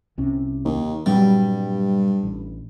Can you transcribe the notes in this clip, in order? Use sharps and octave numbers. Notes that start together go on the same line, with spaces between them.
C2 C3 C#4
D#2
G2 A#2 F#3 G3 C4
A1